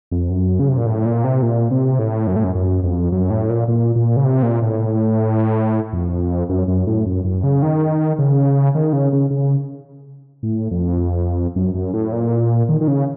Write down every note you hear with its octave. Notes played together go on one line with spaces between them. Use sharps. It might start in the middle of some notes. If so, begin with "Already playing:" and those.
F2
F#2
C#3
C3
A#2
A2
A#2
C3
A#2
C3
A2
F#2
A2
F#2
F#2
F2
F#2
A2
A#2
A#2
A#2
C#3
C3
A#2
A2
F2
F#2
F#2
A2
F#2
F#2
C#3
D#3
C#3
D#3
C#3
C#3
C#3
A2
F2
F#2
F#2
A2
A#2
D#3
D#3
C#3